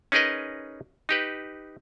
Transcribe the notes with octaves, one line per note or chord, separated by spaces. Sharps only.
C#4 D#4 G#4 A#4 B4 D#5
D#4 G4 B4